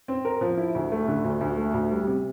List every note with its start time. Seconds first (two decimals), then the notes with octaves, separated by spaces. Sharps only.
0.08 C4
0.25 A#4
0.41 F3
0.58 E4
0.75 D2
0.92 A3
1.08 D3
1.24 D2
1.41 D2
1.57 A3
1.74 D2
1.91 G3
2.07 C3